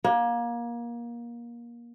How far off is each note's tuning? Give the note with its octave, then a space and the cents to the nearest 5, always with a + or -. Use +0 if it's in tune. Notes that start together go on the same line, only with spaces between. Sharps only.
A#3 +25